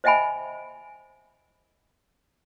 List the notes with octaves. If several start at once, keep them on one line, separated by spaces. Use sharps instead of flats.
C5 D#5 E5 G5 G#5 B5